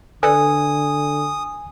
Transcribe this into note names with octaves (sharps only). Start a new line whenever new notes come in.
D3 A4 B4 D5 G#5 D#6